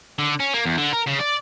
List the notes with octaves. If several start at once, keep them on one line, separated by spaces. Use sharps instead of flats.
D3
C#4
A#3
E2
D3
A#4
C#3
D5